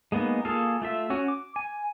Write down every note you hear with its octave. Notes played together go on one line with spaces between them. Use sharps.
G#3 A#3 B3 D#4
A#3 F4 G#4 A4 F5
A3 F4 E5
C#4 F#4
D6
G#5